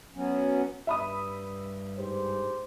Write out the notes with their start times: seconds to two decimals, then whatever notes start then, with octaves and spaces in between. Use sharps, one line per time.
0.15 F#3 B3 C#4
0.87 G2 E5 B5 D#6
1.98 G#2 G4 C5